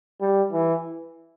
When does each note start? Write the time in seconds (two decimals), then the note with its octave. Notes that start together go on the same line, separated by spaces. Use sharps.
0.21 G3
0.53 E3